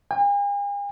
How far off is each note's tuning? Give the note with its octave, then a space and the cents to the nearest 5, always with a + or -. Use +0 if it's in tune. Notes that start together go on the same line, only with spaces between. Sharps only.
G#5 -45